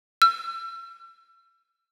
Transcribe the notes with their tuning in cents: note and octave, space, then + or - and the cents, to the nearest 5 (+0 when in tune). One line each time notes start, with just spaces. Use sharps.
E6 +40